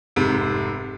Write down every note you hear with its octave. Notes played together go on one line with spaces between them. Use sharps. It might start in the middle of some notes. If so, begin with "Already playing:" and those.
F1 G#2 C3